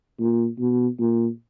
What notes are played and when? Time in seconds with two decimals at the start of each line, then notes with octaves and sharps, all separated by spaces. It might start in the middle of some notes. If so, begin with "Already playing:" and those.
0.19 A#2
0.59 B2
1.00 A#2